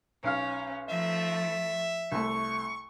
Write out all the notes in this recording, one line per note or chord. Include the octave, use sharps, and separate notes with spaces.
B1 C#4 F5 F6
F3 A3 E5
C2 A3 C#6